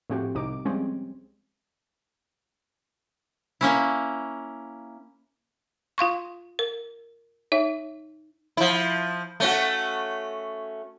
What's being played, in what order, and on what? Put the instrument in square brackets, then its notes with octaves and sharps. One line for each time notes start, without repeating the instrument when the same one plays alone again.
[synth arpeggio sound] A2 F3 C4 F#4 G4
C2 C3 D#4 D6
F3 G3 G#3 C4 C#4
[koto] A#3 C#4 E4
[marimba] F4 F5 C6 C#6
A#4
D#4 C#5 E5
[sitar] F3 E4
A3 C#4 F#4